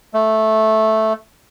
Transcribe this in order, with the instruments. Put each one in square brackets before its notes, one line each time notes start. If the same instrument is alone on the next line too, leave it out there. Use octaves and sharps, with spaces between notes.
[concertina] A3